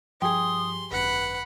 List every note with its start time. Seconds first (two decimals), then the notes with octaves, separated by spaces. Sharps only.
0.22 G2 F3 G4 G#4 C6 D#6
0.91 G#1 F#2 B4 F#5 B5